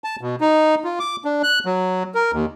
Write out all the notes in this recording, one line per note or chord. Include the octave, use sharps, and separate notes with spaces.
A5
B2
D#4
F4
D6
D4
F#6
F#3
A#4
D#2